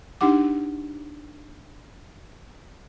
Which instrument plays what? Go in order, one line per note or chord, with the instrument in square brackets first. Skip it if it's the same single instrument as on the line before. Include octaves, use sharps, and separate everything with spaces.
[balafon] D4 D#4 G4 F#5 D6